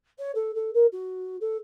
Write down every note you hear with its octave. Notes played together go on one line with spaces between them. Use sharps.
C#5
A4
A4
A#4
F#4
A4